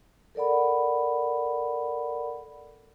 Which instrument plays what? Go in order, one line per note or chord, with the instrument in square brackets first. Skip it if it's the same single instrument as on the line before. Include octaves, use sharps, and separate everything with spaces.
[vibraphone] A4 A#4 D5 F#5 B5